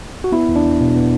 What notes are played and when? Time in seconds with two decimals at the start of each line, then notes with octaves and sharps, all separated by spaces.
0.24 F#4
0.32 B3 E4
0.49 E2
0.56 D4
0.64 E2
0.81 B2
0.96 B3